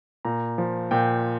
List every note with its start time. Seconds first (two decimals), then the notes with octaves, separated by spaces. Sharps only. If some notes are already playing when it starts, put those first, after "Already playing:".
0.25 A#2 A#5
0.58 F3
0.91 A#2 G5